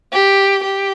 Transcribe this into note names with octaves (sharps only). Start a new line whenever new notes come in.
G4
G4